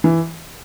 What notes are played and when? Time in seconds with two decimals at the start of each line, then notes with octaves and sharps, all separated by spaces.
0.04 E3